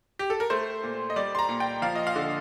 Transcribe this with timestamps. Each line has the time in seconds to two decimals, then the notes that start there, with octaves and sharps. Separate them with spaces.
0.19 G4
0.30 A4
0.40 A#4
0.50 A3 C5
0.83 A#2
1.10 D#5
1.16 G3 D5
1.35 C6
1.39 A#5
1.49 A#2
1.60 G5
1.82 F3 F5
1.95 D#5
2.07 F5
2.16 D3